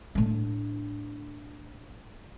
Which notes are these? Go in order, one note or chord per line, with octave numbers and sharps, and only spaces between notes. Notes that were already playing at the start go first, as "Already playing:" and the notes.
A2 D4